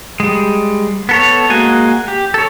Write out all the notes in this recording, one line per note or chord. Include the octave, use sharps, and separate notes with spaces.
G3 G#3
B3 A4 C#5
G#3 A#3 F#4 G#5
G4
A4 C#5